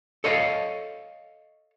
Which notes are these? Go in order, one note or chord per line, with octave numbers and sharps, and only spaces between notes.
A4 C#5 D#5 F5